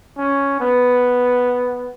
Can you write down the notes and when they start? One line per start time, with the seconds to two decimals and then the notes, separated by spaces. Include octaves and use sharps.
0.18 C#4
0.60 B3